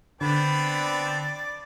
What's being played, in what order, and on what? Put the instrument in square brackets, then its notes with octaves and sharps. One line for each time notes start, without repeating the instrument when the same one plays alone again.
[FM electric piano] D3 [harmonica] B3 C4 D4 [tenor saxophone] D5 [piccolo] B5